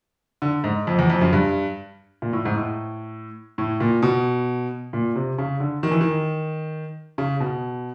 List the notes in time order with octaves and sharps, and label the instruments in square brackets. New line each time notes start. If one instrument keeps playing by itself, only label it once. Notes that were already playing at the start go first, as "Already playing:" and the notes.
[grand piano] D3
G#2
F2
E2
F2
F#2
G2
A#2
A2
G#2
A2
A2
A#2
B2
A#2
C3
C#3
D3
D#3
E3
D#3
C#3
B2